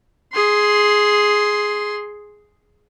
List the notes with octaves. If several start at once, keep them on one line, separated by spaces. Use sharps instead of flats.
G#4 C6